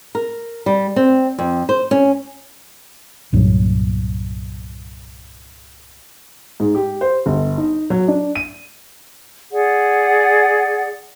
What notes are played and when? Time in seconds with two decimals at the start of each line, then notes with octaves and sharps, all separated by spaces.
0.15 A#4
0.66 G3
0.96 C4
1.38 F2
1.69 C5
1.91 C#4
3.33 C2 G2 A#2 F#3
6.60 G#2
6.75 G4
7.01 C5
7.26 G1
7.58 D#4
7.90 F#3
8.08 D4
8.35 D#7
9.51 G#4 D5 F#5